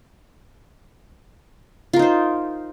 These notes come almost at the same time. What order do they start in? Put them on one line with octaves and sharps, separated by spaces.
F4 A#4 D#4 C5